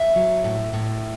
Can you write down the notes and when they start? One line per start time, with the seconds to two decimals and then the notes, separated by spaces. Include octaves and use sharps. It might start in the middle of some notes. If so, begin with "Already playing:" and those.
Already playing: E5
0.16 F#3
0.44 A2
0.73 A2